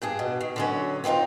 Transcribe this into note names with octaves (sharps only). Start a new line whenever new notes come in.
G2 D4 G#4
B2
D#3
D3 F#3 C#4
B3 C4 D4 D#4 F4